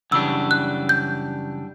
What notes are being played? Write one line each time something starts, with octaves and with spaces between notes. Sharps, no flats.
F#2 C#3 E3 G3 D4 E6
F#6
G6